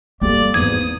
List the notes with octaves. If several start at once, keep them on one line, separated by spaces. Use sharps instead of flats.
G3 A3 A#3 D5
G#1 E2 D#6 G#6